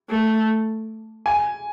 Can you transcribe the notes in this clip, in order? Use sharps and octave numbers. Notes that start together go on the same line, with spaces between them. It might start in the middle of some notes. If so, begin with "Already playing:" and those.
A3
G#5